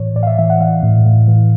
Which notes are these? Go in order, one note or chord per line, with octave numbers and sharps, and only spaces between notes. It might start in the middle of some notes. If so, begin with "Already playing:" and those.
Already playing: A2 E3 C#5
A2 D5
F5
E5
E3 E5
F#5
E3 F5
A2
A2
E3